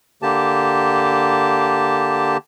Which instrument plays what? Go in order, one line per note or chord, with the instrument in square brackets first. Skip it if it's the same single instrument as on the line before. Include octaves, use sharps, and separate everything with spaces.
[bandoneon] D3 A#3 G4 A5